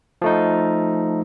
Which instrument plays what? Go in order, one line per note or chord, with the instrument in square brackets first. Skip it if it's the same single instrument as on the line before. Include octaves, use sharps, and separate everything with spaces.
[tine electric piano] F3 A3 D#4